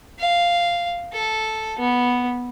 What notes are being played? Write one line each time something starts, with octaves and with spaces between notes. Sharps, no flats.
F5
A4
B3